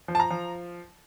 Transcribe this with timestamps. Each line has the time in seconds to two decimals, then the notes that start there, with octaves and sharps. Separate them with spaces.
0.08 F3
0.15 A5
0.20 A#5
0.30 F3